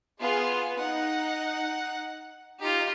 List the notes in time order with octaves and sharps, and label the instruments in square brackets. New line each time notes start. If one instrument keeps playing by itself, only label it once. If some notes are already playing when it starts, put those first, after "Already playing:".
[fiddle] B3 [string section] F4 G#4
[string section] D#4 [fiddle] F#5
[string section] D#4 [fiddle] F4 G4